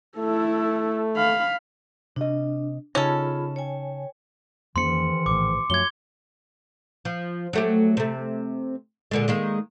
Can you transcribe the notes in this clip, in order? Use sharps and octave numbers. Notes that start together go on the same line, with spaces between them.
A3 E4 A4
F5 B5
C3 D4 D#5
C#3 C#4 D#4 F4 G#4 A4 B5
C#5 G5 G#5
F2 G#2 D#3 E3 A#3 C#4 C6 C#7
A#1 A2 D6
F#2 F3 F#3 A3 C#4 G#6 G7
F3
F#3 A3 G4
C3 A3
A#2 D3 G#3
D#3 G#3 A#3